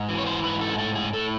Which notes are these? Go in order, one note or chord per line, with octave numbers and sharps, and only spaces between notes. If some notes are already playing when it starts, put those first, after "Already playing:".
Already playing: G#2
E3
C#5
C5
G#2 B4
A4
G#4
A2 A4
G#4
A2 A4